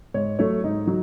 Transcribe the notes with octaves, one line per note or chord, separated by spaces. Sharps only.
G#2 C#5
F#3 A3 C#5
G#2 D#4
F#3